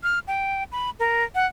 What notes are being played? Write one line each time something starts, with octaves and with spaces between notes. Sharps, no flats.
F6
G5
B5
A#4
F#5